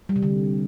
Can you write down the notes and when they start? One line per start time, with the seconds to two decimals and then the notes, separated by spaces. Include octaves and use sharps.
0.09 G3
0.16 C3
0.23 D3